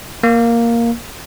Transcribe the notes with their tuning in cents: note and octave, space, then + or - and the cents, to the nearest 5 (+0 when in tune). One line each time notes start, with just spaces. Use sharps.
A#3 +0